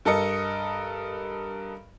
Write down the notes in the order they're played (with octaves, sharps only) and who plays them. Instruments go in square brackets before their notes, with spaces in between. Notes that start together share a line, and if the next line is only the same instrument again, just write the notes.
[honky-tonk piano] G2 A4 A#4 D#5 C#7